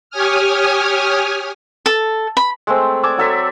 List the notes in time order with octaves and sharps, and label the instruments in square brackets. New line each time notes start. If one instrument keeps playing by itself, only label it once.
[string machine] G4 C#5 G#5 D#6 F6
[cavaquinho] A4
B5
[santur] G#3 A3 C4
D5 G#5 D6 E6
F#3 A4 E5